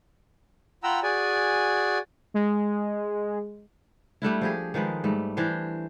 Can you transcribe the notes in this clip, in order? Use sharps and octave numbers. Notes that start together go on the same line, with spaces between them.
F4 F#5 G5 A#5 B5 E6
F#4 G#4 D5 G#5
G#3
G3 A3 D4 E4
F3 G4 G#4
D#3 F3 G#3 B4
G#2 G3 A3
E3 D4 G4 C5